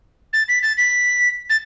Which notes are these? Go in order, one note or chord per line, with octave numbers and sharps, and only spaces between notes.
A6
B6
A6
B6
A6